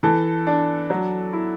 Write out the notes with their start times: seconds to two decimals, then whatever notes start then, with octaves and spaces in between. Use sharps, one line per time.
0.03 E3 A4
0.47 D4
0.90 F#3
1.33 E4